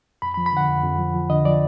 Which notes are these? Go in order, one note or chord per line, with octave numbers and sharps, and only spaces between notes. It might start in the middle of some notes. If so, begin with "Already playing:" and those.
F2 B5
B5
F3
B5
D3 F#5
F2
F2
F3
F3
D3 D#5
F3 D5